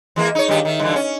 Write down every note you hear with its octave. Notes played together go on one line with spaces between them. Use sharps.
E3 G#3 A#3
D#4 C#5
G2 D#3 G4
D#3 E5
G2 D3 E3
C#4